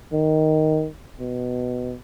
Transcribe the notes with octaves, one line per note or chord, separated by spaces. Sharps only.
D#3
B2